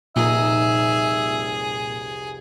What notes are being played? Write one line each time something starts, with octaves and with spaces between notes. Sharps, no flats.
F1 C2 A#2 D#4 G#4 E5